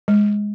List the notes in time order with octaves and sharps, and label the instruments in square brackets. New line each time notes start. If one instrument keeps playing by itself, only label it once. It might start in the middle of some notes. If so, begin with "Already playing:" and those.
[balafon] G#3